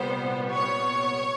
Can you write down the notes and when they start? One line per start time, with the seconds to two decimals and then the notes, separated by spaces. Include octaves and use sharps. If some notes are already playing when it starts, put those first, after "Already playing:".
Already playing: C2 A#2 G3 B3 C5
0.53 C#5